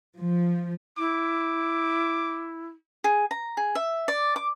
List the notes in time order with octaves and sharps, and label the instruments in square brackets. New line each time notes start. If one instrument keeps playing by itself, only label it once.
[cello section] F3
[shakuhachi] E4 [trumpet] D6
[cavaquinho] G#4
A#5
G#4
E5
D5
D6